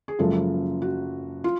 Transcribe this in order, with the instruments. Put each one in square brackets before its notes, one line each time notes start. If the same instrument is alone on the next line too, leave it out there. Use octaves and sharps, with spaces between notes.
[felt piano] G#4
F#1 F#2 F3 G#3 A4
F#4
F4